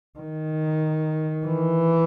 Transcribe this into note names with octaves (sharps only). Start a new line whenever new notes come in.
D#3
E3